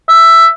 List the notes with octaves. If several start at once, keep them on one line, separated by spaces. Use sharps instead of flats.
E5